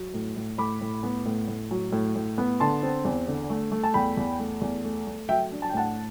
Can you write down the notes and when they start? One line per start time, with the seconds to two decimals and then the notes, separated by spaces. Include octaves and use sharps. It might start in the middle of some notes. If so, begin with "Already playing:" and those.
Already playing: F#3
0.14 A2
0.36 A2
0.58 A2 B5 D6
0.81 A2
1.03 B3
1.26 A2
1.48 A2
1.71 F#3
1.92 A2
2.16 A2
2.38 B3
2.60 D3 A5 C6
2.83 C4
3.05 E2
3.28 D3
3.50 A3
3.72 A3
3.84 A5
3.94 E2 G5 B5
4.17 E2
4.39 A3
4.61 E2
4.84 A3
5.07 A3
5.29 F#3 E5 G5
5.52 D4
5.62 A5
5.70 G5
5.74 A2 F#5 A5